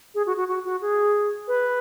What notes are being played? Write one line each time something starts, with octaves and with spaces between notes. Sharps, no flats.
G#4
F#4
F#4
F#4
F#4
G#4
B4